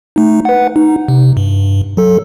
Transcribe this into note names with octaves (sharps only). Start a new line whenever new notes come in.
A3 D#4
B4 F#5
D#4
C3
G2
F#3 A4